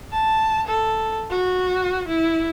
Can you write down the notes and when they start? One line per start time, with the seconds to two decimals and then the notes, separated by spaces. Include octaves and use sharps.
0.12 A5
0.67 A4
1.30 F#4
2.07 E4